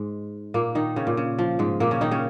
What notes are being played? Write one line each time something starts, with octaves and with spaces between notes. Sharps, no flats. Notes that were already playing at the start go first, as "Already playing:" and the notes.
Already playing: G#2 G#3
A#2 A#3
D#3 D#4
C#3 C#4
A#2
C#3
F3
G#2 G#3
A#2 A#3
C#3 C#4
D#3 D#4
C#3 C#4